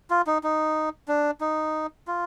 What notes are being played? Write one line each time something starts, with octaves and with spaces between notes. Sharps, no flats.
F4
D#4
D#4
D4
D#4
F4